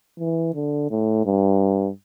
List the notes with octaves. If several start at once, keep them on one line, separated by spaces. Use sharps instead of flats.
E3
D3
A2
G2